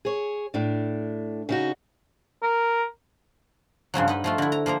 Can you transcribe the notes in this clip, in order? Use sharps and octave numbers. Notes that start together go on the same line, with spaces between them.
G#4 C#5
A2 D4
C#3 D#4 F#4
A#4
G2 C#3 F3 F#3
D#4 B4 D#5
F3 A3 F4
D3 E4
A#5
F3 A#3 C5 A#5